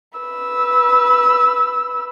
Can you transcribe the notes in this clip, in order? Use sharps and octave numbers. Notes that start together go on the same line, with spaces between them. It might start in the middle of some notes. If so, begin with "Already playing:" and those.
B4 E6